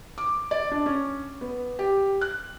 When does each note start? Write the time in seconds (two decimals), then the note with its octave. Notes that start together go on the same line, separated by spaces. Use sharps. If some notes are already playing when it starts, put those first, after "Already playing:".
0.18 D6
0.51 D5
0.72 D4
0.86 C#4
1.41 B3
1.79 G4
2.21 F#6